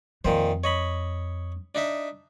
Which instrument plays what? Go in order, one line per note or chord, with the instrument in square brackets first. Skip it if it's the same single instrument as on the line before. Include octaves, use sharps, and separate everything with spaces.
[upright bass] F2 [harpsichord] A#2 D#3 C5
[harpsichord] C#5 D#5 B5
D4 D#4 E5